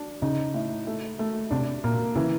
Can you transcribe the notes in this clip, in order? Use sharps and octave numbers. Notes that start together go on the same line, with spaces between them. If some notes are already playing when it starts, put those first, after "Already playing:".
Already playing: D4
C#3 D#4
A2
A3
A3
C3 D4
A#2 A#3
C#3 E3